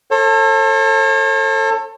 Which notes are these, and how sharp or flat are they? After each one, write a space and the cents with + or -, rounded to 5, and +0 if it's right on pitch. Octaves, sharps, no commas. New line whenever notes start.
A4 +20 C#5 -45